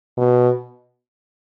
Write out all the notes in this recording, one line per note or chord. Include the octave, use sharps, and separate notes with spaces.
B2